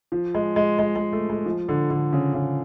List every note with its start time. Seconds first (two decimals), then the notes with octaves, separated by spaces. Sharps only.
0.12 F3
0.34 G#3
0.56 G#3
0.79 G#3
0.96 G#3
1.13 A3
1.30 G#3
1.46 F3
1.69 D3
1.90 D3
2.13 C#3
2.34 C#3